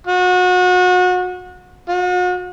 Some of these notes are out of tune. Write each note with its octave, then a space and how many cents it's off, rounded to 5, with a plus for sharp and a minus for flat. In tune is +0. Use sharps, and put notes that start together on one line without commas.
F#4 -30
F#4 -40